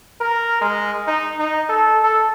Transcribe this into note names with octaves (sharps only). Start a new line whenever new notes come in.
A#4
G#3
D#4
D#4
A4
A4